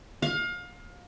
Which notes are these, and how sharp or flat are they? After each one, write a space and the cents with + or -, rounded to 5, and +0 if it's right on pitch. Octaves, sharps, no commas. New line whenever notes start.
F5 +30